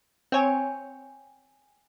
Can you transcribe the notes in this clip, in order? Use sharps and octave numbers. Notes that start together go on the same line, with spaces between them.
C4 C#5 G5 G#5